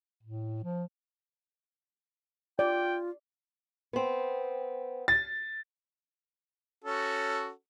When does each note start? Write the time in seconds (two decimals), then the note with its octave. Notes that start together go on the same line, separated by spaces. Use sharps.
0.23 A2
0.64 F3
2.59 F4 D5 G5
3.93 B3 C4
5.08 A6
6.84 C#4 F#4 A4